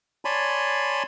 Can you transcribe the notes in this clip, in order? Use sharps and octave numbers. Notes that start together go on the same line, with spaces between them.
C#5 D5 G#5 A5 B5 C6